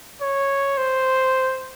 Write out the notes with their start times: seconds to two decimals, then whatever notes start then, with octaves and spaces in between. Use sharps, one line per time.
0.21 C#5
0.78 C5